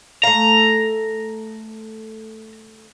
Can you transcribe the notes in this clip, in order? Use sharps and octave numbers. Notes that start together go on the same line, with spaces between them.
A3 F5 A#5